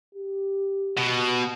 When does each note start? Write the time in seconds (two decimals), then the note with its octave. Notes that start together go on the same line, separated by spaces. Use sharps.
0.15 G4
0.97 B2